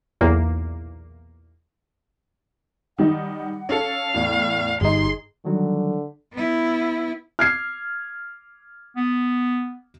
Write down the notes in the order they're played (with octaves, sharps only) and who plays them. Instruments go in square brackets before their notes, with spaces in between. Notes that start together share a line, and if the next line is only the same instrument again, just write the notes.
[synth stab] B1 E2 A#2 A#3
[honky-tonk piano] D#3 G3 D#4 [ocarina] F#5
[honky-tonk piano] C#4 A4 [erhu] F5
[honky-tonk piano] E2 A2 [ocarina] D5
[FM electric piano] G1 D#4 [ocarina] G4 [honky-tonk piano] G#4 [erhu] C6
[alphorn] D3 [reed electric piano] D#3 F#3 G3
[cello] B3 E4
[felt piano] F6 G#6 C7
[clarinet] B3